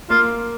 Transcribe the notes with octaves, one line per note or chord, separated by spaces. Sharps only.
A#3 F4